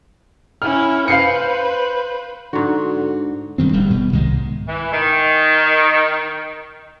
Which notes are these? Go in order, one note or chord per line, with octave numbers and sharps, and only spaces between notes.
C#4 E4 F6
B4 C5 F5 C7 C#7
G#2 D3 F#4
G2 D#3 C4
D1 D#2 G3
B2
C2 G#2 D#3 G#3
E3
D#3